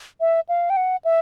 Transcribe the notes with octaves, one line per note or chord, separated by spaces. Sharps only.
E5
F5
G5
F#5
E5